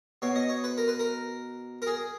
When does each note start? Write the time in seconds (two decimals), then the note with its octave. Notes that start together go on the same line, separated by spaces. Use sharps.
0.22 B2 C#5
0.35 D#5
0.49 C#5
0.64 B4
0.78 A#4
0.88 B4
0.99 A#4
1.82 A#4
1.87 G#4